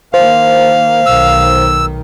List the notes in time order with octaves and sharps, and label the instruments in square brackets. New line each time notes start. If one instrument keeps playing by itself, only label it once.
[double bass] D#3 A#3 [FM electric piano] C5 [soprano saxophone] F5
[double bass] B1 D#3 [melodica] E6